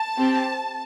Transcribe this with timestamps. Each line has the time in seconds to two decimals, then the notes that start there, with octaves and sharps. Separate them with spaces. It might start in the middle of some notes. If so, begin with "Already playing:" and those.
Already playing: A5
0.17 C4 G4